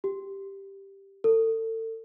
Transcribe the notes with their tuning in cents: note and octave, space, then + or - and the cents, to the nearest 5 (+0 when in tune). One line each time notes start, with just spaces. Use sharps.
G4 +0
A4 +35